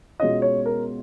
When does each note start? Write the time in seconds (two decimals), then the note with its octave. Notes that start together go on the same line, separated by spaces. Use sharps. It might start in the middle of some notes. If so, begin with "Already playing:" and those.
0.20 B2 G#3 C#4 F4 D#5
0.42 C#5
0.66 A#4